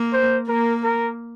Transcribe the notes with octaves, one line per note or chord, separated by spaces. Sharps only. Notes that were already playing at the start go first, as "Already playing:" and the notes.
Already playing: A#3
C5
A#3 A#4
A#4